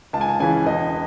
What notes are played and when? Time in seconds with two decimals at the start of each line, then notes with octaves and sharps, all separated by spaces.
0.13 C#2 A5
0.21 G#5
0.29 A5
0.40 C#3 E3 G#5
0.66 E1 D#5